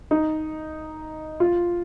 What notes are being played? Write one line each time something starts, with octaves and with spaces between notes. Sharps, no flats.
D#4
F4